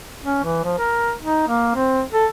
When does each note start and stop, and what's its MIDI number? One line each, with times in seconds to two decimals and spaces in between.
0.23 0.43 61
0.44 0.59 52
0.64 0.75 53
0.78 1.12 70
1.22 1.45 63
1.48 1.73 58
1.75 2.02 60
2.12 2.26 69